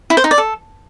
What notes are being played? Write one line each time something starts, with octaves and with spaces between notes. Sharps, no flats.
E4
C5
D#4
D5
A4